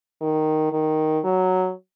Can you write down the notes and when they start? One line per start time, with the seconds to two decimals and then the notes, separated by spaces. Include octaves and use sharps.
0.21 D#3
0.72 D#3
1.24 F#3